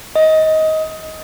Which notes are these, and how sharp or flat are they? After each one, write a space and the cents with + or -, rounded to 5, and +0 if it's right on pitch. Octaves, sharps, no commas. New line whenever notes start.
D#5 +20